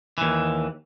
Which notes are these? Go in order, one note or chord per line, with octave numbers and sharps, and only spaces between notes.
D#2 E3